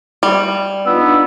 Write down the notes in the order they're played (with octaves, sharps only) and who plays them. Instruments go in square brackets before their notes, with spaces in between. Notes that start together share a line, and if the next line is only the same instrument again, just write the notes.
[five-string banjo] G3
[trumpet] B3 [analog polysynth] D4 D#4 F4 [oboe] E6